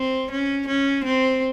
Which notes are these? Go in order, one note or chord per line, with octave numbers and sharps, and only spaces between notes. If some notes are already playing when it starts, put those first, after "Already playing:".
Already playing: C4
C#4
C#4
C4